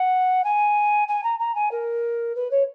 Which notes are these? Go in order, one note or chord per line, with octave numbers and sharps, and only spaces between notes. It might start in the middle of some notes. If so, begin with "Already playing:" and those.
Already playing: F#5
G#5
G#5
A#5
A#5
G#5
A#4
B4
C#5